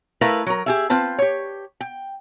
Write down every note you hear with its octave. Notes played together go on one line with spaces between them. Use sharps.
A3 E4 A#4 B4 E5 F5
F#3 A#4
G4 G#4 E5
C4 F4 B4 A5
G4 C#5
G5